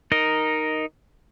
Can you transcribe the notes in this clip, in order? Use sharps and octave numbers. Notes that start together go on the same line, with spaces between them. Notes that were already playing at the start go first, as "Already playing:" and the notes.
D#4 A#4 D#5